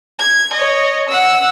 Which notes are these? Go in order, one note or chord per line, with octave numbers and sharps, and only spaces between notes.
G#6
C#5 D#5
F#5 E6